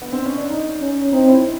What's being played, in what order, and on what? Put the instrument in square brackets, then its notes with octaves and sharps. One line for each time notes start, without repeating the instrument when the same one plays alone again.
[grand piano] B3
C4
C#4
D4
D#4
[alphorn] C#4
[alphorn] C4 [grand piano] D#4
[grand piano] E4